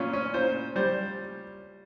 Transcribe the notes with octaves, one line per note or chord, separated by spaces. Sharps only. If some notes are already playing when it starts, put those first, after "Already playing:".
Already playing: A#2 C#4
C#4
A#2 C5
G3 C5